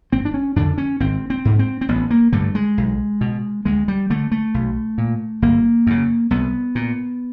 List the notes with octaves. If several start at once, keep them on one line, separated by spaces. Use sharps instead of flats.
G1 C4
D4
C#4
F2 D3 D4
C#4
G#1 C4
C4
G#2
C4
C4
A1 B3
A#3
G2 D3 A3
G#3
B1
B2
D2 G#3
G3
D3 A3
A3
B1
A#2
G1 A#3
F#2 C#3
C2 B3
A#2